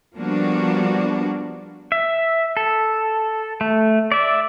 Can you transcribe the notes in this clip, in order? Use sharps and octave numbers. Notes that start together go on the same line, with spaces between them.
F3 G3 A#3 B3 D4 F#4
E5
A4
A3
D5 E5